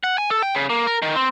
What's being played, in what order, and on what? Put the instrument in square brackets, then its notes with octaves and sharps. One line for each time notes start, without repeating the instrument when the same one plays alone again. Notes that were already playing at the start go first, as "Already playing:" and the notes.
[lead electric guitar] F#5
G#5
A4
G5
C#3
A#3
A#4
D#3
C4